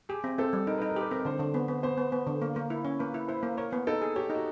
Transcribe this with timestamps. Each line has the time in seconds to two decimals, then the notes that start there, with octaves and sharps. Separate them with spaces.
0.09 G4 G#4
0.24 C4
0.38 C4 A4
0.53 G3
0.67 D#4 A#4
0.78 D#4 B4
0.90 A#4
0.96 G4 B4
1.11 C4 A#4
1.25 D3 C5
1.40 D3
1.54 B3
1.68 B3
1.83 B3 C5
1.98 B3
2.12 B3
2.27 D3
2.42 A#3
2.56 A#3
2.70 E4
2.85 C#4
2.99 A#3 B4
3.14 E4
3.28 E4 C5
3.43 A#3
3.57 A#4 C#5
3.73 B3
3.87 D#4 A4
4.02 G#4
4.16 G4 C#5
4.30 D#4 F#4